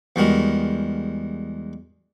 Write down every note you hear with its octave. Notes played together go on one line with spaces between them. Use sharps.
E2 G3 G#3 F#4 A#4